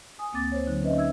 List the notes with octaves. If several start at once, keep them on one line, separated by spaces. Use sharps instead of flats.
G#5 D#6
D2 A#3 C4 D6 A6
C5 C#5
D3 F#3 D#4
C#4 B4 D#5 E5
D#4 E5 E6 G#6